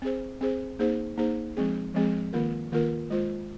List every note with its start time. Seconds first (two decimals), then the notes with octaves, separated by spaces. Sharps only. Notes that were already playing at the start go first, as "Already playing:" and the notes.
0.02 C4 G#4 C5
0.41 C4 G#4 C5
0.79 A#3 D#4 G#4 C5
1.17 A#3 D#4 G#4 C5
1.57 F3 G#3 C4 G#4
1.94 F3 G#3 C4 G#4
2.33 D#3 A#3 F4 A#4
2.72 D#3 A#3 F4 A#4
3.10 G#3 F4 C5